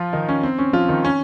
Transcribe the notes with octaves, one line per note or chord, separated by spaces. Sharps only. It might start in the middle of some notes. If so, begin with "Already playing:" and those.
Already playing: F3 F4
D#3 D#4
C#4
C4
C#4
F3 F4
D#3 D#4
C#4